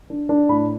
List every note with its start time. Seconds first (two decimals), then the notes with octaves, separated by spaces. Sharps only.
0.10 D4
0.29 D4
0.49 A2 B5